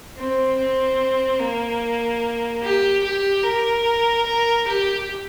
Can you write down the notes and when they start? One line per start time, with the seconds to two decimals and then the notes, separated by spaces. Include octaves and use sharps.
0.17 C4
0.58 C4
1.40 A#3
2.63 G4
3.04 G4
3.44 A#4
4.26 A#4
4.67 G4